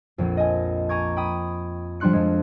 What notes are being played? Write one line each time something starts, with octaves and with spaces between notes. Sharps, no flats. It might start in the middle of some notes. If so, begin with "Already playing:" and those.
A#1 F2
D#5 G#5
G#5 A#5 C#6 D6 G#6
G5 B5 D#6
F3 G3 D4 C6 F#6 C#7
F2 G#3